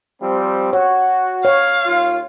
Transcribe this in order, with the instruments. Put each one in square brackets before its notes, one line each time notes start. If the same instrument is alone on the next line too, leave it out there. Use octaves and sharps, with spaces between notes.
[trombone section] F3 G3 C4
[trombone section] F#4 [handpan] C#5
[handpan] C#5 [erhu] F5
[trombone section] D#2 F4